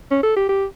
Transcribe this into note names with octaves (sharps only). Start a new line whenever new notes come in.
C#4
A4
G4
G4